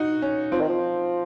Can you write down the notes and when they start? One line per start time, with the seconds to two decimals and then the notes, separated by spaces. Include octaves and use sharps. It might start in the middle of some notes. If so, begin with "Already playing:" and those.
Already playing: D#4 F#4
0.22 C#4
0.52 F3 C4
0.60 D#3
0.69 F3